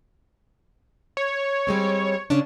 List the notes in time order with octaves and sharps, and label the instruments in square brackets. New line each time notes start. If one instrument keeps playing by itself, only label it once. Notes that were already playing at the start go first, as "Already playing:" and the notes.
[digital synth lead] C#5
[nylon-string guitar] G3 G#3 C4
C#3 C#4 D4